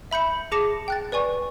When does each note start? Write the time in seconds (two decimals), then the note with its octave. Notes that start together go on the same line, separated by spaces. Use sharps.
0.11 E5 B5 G6 C#7
0.52 G#4 A5 D6 A#6 C#7 E7
0.88 G5 F#6 A6
1.12 B4 D5 G#5 C#6